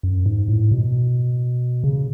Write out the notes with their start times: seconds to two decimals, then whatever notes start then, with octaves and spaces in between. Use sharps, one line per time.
0.03 F#2
0.26 G#2
0.48 A2
0.71 B2
1.84 C#3